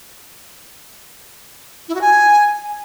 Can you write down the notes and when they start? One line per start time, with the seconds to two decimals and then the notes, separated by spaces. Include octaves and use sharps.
1.88 E4
1.95 F#4
2.01 G#5